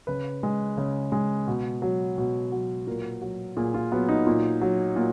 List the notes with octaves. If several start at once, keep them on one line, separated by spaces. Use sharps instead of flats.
C#3 B4
G#3
C#3
G#3
B2
F#3
B2
F#3
A#2 A#4
F#3
A#2 G#4
F4
F#3 B3
D#4
A#2
F#3
A#2 F#4